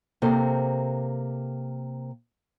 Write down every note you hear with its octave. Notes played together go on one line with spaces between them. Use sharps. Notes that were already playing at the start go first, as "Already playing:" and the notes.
C3 A#3 A4 C5